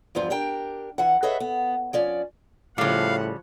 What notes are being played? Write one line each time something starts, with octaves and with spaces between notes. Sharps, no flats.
E2 G2 F3 F4
D4 G4 A#4 G5
E3 F#5
G#4 A4 B4 C#5 D#5 E5
B3
F3 C#4 D5
A2 C#3 F3 G3 F5 F#5